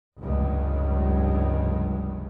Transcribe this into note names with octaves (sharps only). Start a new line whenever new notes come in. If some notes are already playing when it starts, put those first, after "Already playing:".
F1 C#2 G2